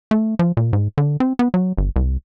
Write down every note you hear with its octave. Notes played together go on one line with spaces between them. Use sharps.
A3
F3
A#2
G#2
D3
C4
B3
F#3
G1
C2